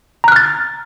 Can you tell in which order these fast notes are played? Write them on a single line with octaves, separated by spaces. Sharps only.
A#5 F#6 F6 A6